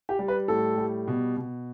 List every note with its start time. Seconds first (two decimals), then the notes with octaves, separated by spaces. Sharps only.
0.09 G4
0.19 G3
0.28 B4
0.48 A2 A4
0.78 G3
1.08 B2
1.37 B2